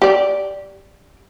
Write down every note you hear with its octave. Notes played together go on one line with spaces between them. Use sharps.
G4 D5